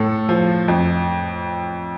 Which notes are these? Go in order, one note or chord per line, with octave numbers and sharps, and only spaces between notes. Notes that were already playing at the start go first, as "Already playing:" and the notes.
Already playing: A2 A4
F3
F2